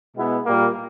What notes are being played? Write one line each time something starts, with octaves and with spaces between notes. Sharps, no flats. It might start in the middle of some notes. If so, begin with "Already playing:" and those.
B2 G#3 B3 E4
A#2 G3 A#3